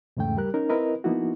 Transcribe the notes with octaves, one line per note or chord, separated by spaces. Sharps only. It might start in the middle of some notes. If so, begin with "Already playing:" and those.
E2 G#2 C#3 A3 G5
G3 G4 A#4 F#6
C#4 D#4 A#4
C4 E4 A#4 B4 D#5
F3 A#3 B3 D#4 E4 F#4